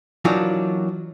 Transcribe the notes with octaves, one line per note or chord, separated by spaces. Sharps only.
E3 F#3 A#3 D4 D#4 F4